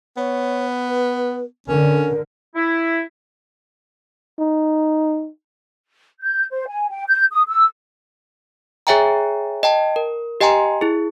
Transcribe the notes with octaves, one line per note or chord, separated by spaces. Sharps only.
B3 C#5
B4
D3 C#4 A#4
E4
D#4
G6
C5
G#5
G5
G6
D#6
E6
G#4 C#5 E5 G5 G#5 A#5
D#5 G5 A5
A#4
G4 D#5 G5 G#5 A#5 C6
E4 G#4